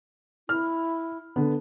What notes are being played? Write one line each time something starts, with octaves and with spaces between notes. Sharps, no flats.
E4 F6
D3 B3